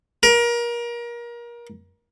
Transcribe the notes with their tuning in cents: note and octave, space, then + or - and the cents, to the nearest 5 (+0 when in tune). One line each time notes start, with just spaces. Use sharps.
A#4 +30